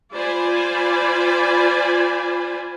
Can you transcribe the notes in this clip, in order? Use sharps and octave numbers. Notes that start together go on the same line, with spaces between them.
F4 C5 D5 G#5 B5